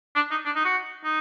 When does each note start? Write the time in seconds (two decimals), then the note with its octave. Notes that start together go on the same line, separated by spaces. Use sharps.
0.15 D4
0.31 D#4
0.45 D4
0.56 D#4
0.65 F#4
1.04 D#4